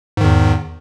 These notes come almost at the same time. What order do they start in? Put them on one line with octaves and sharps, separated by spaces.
G#2 D#3 E2